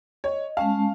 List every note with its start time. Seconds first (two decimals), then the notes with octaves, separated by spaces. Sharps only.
0.24 C#5 D#5
0.57 G#3 C#4 F5 A5